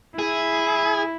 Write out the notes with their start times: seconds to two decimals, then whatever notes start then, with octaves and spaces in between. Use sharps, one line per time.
0.19 E4 G#4